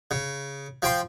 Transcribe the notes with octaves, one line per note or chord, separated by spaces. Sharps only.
C#3
F3 G5 C6